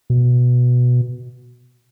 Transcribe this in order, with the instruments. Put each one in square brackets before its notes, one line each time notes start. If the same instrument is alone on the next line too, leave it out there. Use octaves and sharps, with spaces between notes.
[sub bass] B2